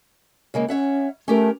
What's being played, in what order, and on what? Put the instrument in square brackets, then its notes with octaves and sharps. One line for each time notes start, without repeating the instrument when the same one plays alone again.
[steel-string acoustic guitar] C#3 G#3 A#3
[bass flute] C#4 [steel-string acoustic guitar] C#5 E5 F#5
[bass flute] A3 [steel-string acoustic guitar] C#4 G4 A#4